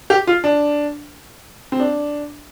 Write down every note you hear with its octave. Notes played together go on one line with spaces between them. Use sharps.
G4
F4
D4
C4
D4